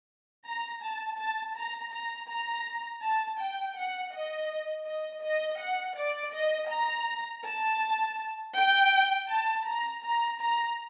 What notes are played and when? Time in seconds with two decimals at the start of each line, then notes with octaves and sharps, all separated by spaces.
0.45 A#5
0.81 A5
1.17 A5
1.55 A#5
1.91 A#5
2.29 A#5
3.03 A5
3.40 G5
3.76 F#5
4.12 D#5
4.86 D#5
5.24 D#5
5.60 F#5
5.97 D5
6.33 D#5
6.71 A#5
7.45 A5
8.55 G5
9.28 A5
9.66 A#5
10.03 A#5
10.39 A#5